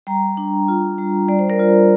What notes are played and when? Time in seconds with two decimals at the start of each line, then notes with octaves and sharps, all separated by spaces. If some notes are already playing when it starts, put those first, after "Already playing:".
0.07 G3 G5 A#5
0.37 D4
0.68 F4
0.98 G3
1.28 G3 D5
1.39 C5
1.50 A#4 D5
1.59 F4